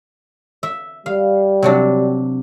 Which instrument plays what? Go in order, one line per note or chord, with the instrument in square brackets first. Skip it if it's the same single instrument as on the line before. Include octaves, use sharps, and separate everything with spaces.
[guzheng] E5
[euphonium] G3 [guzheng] F5
[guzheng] C3 F#3 D4